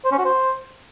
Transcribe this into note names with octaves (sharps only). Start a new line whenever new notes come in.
C5
C#4
F#4
C5